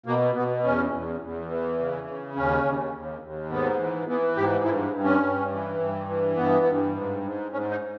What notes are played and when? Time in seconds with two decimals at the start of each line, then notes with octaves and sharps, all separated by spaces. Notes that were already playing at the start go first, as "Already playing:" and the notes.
0.06 B2 A#3
0.35 B2 B3
0.63 E2 C#4
0.93 E2
1.21 E2
1.50 E3
1.79 C#3
2.07 C#3
2.36 D#2 C#4
2.64 D#2
2.94 D#2
3.22 D#2
3.50 G#2 B3
3.78 E3
4.07 E3 B3
4.36 G#2 G4
4.64 G2 E4
4.93 G2
5.04 C#4
5.23 G2
5.51 E3
5.80 G2
6.08 E3
6.36 G2 B3
6.65 G2
6.94 G#2
7.23 G#2
7.52 G#2 C#4
7.70 D#4